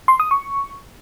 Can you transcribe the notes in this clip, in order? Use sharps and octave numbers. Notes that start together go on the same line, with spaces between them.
C6
D#6
C#6